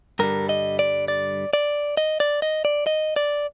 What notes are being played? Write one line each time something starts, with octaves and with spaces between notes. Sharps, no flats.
G2 D3 G3 A#4
D#5
D5
D5
D5
D#5
D5
D#5
D5
D#5
D5